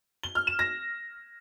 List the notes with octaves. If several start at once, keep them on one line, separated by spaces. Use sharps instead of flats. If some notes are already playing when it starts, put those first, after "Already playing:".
G7
F6
E7
A#6